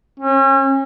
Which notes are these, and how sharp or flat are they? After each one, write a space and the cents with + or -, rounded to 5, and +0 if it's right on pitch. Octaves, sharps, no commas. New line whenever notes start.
C#4 -35